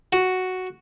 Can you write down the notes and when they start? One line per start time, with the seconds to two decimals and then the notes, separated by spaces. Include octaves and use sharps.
0.13 F#4